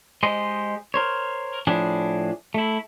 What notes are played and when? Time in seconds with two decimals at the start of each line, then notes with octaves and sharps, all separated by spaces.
0.23 G#3 G4 C5 D#5
0.94 A#4 C5 C#5
1.67 A2 F3 D4 G#4
2.54 A3 E4